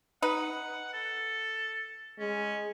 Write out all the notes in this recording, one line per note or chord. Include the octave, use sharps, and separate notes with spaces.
D#4 B4 F#5
A4
G#3 C#4